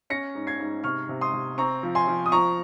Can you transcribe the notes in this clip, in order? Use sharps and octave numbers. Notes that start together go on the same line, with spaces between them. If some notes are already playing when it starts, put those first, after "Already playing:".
C#4 A#6 C#7
G#2
G#6 C7
G#2
C3 C#6 F6
C3
C6 D#6
C3
C4 A#5 C#6
F3
G#5 C6
F3
D#6
F3 A#5 C#6